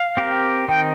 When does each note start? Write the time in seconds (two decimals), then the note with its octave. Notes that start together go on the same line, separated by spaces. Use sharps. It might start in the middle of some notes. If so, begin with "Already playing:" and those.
Already playing: F5
0.17 C4 G4 A#4
0.68 D#3 C4 D#4 G5